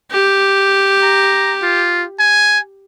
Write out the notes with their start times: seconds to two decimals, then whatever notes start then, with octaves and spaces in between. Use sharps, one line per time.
0.11 G4
1.02 A#5
1.62 F4
2.20 G#5